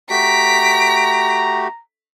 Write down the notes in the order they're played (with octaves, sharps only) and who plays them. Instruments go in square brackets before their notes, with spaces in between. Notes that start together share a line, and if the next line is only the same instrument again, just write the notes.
[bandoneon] A3 F#4 G4 [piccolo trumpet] A#5 [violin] B6 D7